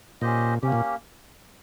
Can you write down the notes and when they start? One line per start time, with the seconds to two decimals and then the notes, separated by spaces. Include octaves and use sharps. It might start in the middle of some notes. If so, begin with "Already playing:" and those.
0.21 A#2 C#4 G4 C5 D#5
0.62 C3 A#3 C#4 G4
0.72 A#2